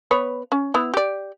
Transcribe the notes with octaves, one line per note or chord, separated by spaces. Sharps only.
B3 B4 C#5
C#4
B3 E4
G4 D5